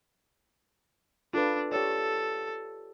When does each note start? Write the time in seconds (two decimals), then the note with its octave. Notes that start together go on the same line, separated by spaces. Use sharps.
1.34 D4 F4 A4 B4
1.72 G4 A4 C#5 D5